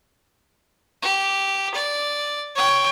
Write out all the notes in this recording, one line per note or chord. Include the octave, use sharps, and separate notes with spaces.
G4
D5
C#5 G5